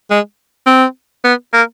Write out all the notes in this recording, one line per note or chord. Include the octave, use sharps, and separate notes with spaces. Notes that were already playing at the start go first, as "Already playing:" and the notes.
G#3
C4
B3
A#3